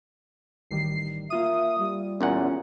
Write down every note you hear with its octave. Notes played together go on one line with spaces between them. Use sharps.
A1 D#3 G3 C7
A#3 F4 E5 D#6 D#7
G3
E2 A#2 C#4 F#5